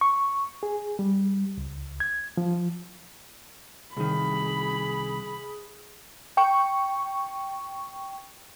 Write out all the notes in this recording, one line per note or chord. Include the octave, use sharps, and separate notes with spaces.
C#6
G#4
G3
C#2
G#6
F3
C2 D#3 G#4 B5
G5 C#6